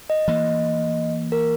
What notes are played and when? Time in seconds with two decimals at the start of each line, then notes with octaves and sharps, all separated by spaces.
0.10 D#5
0.28 E3 A#3
1.32 A#4